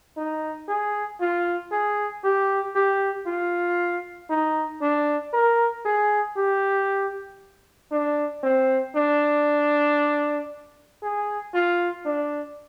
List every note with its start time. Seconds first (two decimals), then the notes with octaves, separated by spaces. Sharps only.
0.17 D#4
0.68 G#4
1.21 F4
1.72 G#4
2.24 G4
2.75 G4
3.27 F4
4.30 D#4
4.82 D4
5.33 A#4
5.86 G#4
6.37 G4
7.92 D4
8.44 C4
8.96 D4
11.03 G#4
11.54 F4
12.06 D4